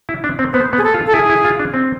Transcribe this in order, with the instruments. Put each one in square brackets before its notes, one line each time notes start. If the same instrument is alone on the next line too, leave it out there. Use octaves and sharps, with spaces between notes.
[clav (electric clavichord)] E4
D4
C4
[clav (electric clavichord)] B3 [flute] C5
[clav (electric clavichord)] B3
[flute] G#4
A4
[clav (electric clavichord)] F4
[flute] A4
[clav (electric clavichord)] E4 [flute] G#4
[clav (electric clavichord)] E4
F4
D4
C4